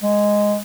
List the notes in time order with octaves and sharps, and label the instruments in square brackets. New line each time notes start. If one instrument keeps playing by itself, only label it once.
[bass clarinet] G#3